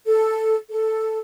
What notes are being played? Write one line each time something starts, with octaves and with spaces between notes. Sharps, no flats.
A4
A4